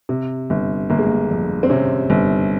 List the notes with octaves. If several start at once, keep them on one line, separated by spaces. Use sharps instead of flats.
C3
G1
G1 A#3
G#3
A#3
F2
C4
C3 C#4
G1